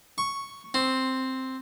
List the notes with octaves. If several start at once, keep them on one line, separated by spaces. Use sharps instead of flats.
C#6
C4